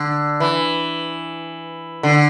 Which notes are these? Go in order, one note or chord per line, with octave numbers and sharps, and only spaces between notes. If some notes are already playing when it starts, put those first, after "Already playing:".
Already playing: D3
E3
D3